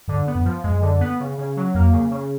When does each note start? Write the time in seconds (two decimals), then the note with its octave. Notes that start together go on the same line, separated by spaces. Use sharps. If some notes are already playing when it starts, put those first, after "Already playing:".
0.08 G2 D3
0.27 B3
0.35 F#2
0.45 F3
0.63 F#2 G#3
0.82 D3
1.00 B3
1.20 C#3
1.38 C#3
1.56 F#3
1.75 F2 A#3
1.93 C#3
2.11 C#3